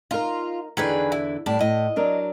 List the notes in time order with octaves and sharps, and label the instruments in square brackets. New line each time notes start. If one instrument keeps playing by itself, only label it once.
[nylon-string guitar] D#4 A#4 [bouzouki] F4
[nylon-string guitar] E2 D3 D4 [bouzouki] D#3 G#4 B4
[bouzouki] E4
[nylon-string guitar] A2 G3 [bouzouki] D4
[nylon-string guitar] A2 [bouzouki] D#5
[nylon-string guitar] F#3 D4 A#4